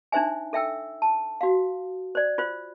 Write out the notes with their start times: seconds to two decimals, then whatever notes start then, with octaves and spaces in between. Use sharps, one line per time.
0.12 D4 D#4 C5 E5 G#5
0.53 A4 E5 G5 E6
1.02 A5
1.41 F#4 F5
2.15 C5 D5
2.38 F4 C5